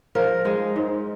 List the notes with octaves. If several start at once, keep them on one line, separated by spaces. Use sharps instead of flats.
F3 A#4
G#3 D#4
G#2